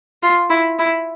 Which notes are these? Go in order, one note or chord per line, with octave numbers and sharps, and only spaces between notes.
F4
E4
E4